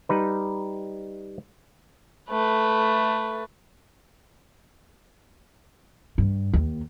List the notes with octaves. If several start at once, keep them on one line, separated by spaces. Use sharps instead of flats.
G3 D#4 B4
A3 B4
G2
D#2